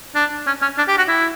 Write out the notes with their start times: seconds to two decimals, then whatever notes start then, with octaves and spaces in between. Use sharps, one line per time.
0.15 D4
0.47 C#4
0.62 C#4
0.78 D4
0.88 G4
0.98 F#4
1.08 E4